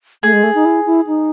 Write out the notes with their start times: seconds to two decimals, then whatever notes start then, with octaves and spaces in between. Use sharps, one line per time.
0.23 A3 G#4
0.33 G#3
0.43 A3
0.55 D#4
0.65 E4
0.86 E4
1.07 D#4